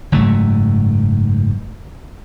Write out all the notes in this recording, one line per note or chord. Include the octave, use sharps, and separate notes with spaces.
F#1 G#2 F#3 A3